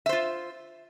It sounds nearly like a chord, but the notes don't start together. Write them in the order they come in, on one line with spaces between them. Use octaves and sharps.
E5 C5 F4